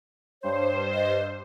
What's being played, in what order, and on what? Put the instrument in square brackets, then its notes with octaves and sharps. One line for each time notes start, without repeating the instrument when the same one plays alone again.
[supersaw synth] G2 C5 [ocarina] C#5
[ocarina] D#5